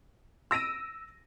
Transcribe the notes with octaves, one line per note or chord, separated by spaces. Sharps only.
E6 A#6 D7 D#7